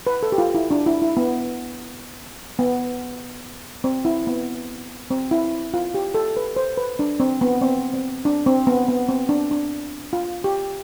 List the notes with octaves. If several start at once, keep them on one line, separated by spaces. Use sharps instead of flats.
B4
A4
G4
F4
E4
D4
E4
E4
B3
B3
C4
E4
B3
C4
E4
F4
G4
A4
B4
C5
B4
D4
C4
B3
C4
C4
D4
C4
B3
B3
C4
D4
D4
F4
G4